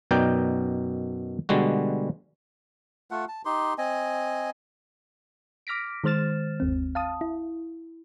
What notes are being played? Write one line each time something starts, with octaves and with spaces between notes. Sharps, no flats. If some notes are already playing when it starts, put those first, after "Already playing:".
F#2 B2 D#4 A#4 D5 G5
B2 D3 G3 G#3 F#4
A3 F4 F#5
A5
D#4 G4 C6
C4 D#5 G#5
D6 F6 A#6 B6 D7
D#3 G#3 C5 F6 A6 E7
G1 D#2 C4
F5 A5 D#6
E4